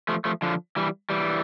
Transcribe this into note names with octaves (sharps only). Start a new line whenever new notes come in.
F3 A3
F3 A3
D3 F3
E3 G3
E3 G3